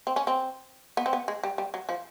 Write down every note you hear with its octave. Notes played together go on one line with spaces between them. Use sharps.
C4
C#4
C4
B3
C4
B3
G#3
G3
G3
F#3
F3